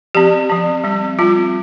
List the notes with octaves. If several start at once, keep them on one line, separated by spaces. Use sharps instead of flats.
F3 C4 G4
F3 C4
G3 C4
G3 C4 F4